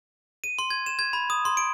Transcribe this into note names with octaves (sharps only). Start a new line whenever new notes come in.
D#7
C6
G#6
E7
G#6
B5
D#6
C6
D7